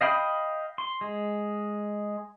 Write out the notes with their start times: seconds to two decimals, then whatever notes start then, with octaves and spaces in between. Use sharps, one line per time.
0.01 D#5 F5 G5 B5 D#6
0.78 C6
1.01 G#3